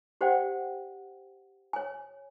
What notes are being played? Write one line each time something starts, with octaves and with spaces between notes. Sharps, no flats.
G4 C5 D5 F#5 G5
C#5 G#5